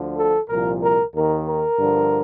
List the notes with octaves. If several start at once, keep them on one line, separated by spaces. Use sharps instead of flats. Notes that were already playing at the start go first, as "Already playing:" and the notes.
Already playing: D2 D3 F3
A4
C2 A#2 F3 A#4
A#4
D#2 D#3 A#4
A#4
G2 D3 F3